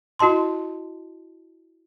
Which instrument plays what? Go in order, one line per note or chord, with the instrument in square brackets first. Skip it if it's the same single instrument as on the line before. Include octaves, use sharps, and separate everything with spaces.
[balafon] E4 F#4 D#5 A5 C6